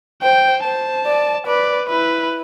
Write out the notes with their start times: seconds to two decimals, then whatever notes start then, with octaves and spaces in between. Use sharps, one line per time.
0.22 C5 G5
0.63 C5 A5
1.06 D5
1.47 B4 D5
1.89 E4 B4